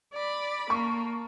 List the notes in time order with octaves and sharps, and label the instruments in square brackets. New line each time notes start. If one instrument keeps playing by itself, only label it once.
[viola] D5 B5
[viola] A#3 [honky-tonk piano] A5 C#6